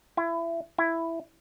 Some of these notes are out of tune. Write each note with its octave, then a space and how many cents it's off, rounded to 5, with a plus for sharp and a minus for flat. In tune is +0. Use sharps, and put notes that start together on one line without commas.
E4 +25
E4 +5